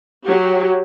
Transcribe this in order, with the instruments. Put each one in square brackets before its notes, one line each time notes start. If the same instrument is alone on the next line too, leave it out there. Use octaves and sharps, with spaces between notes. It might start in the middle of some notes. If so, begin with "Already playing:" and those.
[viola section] F#3 G4